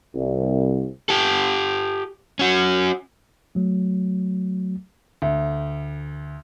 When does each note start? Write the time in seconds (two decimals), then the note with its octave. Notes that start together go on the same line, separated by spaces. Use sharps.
0.14 C2
1.09 G4 A4
2.39 C#4 F#4
3.55 F#3 A3
5.22 D2